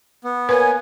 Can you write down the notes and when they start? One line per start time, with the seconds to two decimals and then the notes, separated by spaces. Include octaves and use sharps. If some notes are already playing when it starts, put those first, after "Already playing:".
0.24 B3
0.49 A#3 B4 C#5 G#5